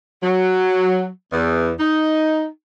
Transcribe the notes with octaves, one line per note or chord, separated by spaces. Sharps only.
F#3
E2
D#4